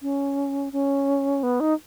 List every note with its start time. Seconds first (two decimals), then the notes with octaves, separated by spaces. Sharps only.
0.02 C#4
0.73 C#4
1.43 B3
1.60 D#4